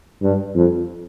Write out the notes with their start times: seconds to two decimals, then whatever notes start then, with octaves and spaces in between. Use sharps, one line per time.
0.22 G2
0.55 F2